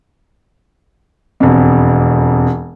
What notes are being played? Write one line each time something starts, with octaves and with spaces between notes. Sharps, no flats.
E1 F2